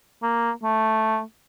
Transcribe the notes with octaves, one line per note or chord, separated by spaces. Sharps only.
A#3
A3